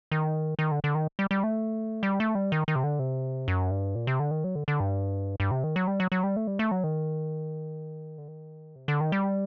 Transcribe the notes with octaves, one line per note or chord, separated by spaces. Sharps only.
D#3
D#3
D3
D3
D#3
G3
G3
A3
G3
A3
G3
D#3
D#3
C3
D3
C3
F#2
G2
A#2
C3
D3
D#3
F#3
D3
D3
G2
G2
C3
D#3
F#3
G3
F#3
F#3
G3
A3
G3
A3
F#3
D#3
D3
D#3
C3
D3
D#3
G3